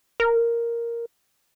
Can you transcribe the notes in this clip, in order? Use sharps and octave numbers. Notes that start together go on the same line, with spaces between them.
A#4